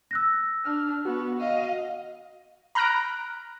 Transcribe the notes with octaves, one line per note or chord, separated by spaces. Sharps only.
E6 F#6 A#6
D4 F6
B3 F#4
D#5 F5
A#5 B5 F6 F#6 A#6 D7